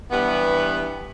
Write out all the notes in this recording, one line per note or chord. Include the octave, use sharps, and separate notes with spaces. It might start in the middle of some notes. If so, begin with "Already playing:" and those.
G2 E3 G3 B3